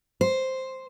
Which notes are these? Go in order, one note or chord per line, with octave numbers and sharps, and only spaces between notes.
C5